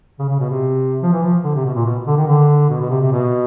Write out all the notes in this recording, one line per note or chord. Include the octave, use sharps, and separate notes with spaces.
C#3
C#3
B2
C3
F3
E3
F3
D3
C3
B2
A#2
B2
D3
D#3
D3
B2
B2
C3
C3
B2